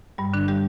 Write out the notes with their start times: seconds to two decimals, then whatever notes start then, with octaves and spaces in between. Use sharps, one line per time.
0.18 G2 G3
0.33 D3 D4
0.48 G3 G4